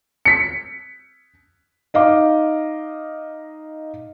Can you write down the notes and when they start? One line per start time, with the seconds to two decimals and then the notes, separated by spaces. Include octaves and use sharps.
0.25 B6 C#7
1.94 D#4 D#5 F5 D6